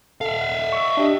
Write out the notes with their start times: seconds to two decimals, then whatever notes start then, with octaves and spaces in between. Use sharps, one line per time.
0.21 A4 E5 F5
0.41 F#5
0.73 C#6 E6
0.97 D4 G4 D#5